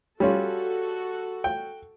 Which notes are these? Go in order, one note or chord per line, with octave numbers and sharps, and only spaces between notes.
G3 C#4 F4 F#4 A4
G5